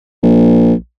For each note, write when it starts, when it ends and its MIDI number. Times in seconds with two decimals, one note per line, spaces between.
0.23 0.74 34